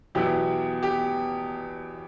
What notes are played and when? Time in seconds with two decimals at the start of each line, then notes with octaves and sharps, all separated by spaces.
0.15 E2 B2 F#3 B3 E4 G4
0.83 G4